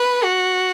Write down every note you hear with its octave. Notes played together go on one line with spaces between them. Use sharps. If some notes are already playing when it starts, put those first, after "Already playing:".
Already playing: B4
F#4